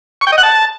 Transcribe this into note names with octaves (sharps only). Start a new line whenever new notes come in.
C#6
G5
D#5
F#5
A5